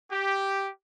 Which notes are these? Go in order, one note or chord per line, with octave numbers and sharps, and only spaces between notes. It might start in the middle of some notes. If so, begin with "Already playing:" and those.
G4